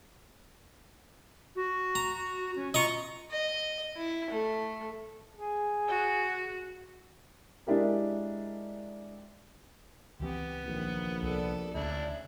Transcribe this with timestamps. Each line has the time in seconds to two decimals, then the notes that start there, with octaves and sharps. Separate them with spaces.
1.56 F#4
1.95 A#5
2.56 C#4
2.74 F4 D#5 A#5 C#6
3.31 D#5
3.97 E4
4.30 A3
5.37 G#4
5.88 F#4
7.67 G#3 D4 E4 G4 A#4
10.20 C#2 E3 B3 C4 G4
10.65 A#1 D#3
11.23 C2 A4 D5
11.75 D2 C#3 D4 E4